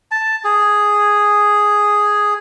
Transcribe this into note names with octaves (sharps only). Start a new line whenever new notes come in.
A5
G#4